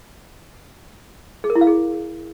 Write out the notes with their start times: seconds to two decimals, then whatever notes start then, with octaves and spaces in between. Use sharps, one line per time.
1.44 G#4
1.50 A#4
1.55 E4
1.61 F5
1.67 G#4